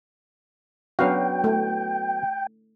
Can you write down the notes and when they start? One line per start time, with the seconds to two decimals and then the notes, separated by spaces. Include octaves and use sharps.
0.99 F#3 B3 C#4 D4 F#4 F5 G5
1.44 A3